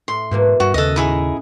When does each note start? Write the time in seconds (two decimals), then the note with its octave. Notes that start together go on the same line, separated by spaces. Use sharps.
0.08 A2 C6
0.31 G#2 B2 E3 A#3
0.60 G2 F#4
0.74 D#2 C#3 C#4 F#4 A4 D#5
0.96 A2 C#4 D#4 E4 G#4